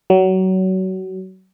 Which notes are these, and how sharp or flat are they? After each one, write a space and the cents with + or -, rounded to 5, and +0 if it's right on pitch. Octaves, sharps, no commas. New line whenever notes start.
F#3 +25